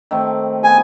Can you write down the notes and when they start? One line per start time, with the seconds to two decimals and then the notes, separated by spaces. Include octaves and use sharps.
0.11 D#3 A3 C4
0.64 B3 G#5